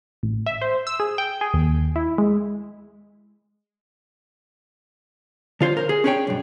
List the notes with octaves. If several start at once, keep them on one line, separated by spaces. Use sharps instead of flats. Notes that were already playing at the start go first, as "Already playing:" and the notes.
A1
E5
C5
E6
G#4
G5
G#4
D#2
E4
G#3
D3 F4 C5 C#5
A#4 C5
G#4
C#4 D4 G#4 B4 C#5 G5
B1 G2